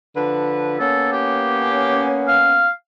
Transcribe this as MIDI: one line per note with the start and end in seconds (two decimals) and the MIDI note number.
0.16 0.79 50
0.16 0.79 53
0.16 0.79 71
0.80 2.67 58
0.80 2.67 59
0.80 2.67 61
0.80 1.08 69
1.12 2.07 67
2.28 2.69 77